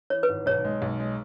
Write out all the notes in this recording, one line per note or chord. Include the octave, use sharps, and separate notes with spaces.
E3 C#5
B4
G#1
B1 C#5
G#3
B1
G#3